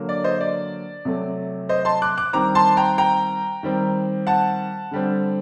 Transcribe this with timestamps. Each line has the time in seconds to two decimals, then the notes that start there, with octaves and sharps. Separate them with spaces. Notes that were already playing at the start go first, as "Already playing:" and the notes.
Already playing: D3 F#3 A#3
0.09 D5
0.24 C5 D#5
0.41 D5
1.05 C3 F#3 A3
1.69 C5 D#5
1.85 A5 C6
2.02 D6 F#6
2.18 D6 F#6
2.33 D#3 G3 C4 A#5 D6
2.55 A5 C6
2.77 G5 A#5
2.98 G5 A#5
3.63 D#3 G3 C4
4.27 F#5 A5
4.91 D3 G3 C4